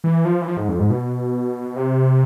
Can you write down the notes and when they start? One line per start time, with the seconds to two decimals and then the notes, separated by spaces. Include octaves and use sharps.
0.04 E3
0.25 F3
0.42 E3
0.47 F3
0.57 G#2
0.69 F2
0.79 G#2
0.90 B2
1.76 C3